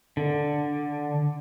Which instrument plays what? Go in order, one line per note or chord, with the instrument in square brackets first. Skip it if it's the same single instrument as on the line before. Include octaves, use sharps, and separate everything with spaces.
[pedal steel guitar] D3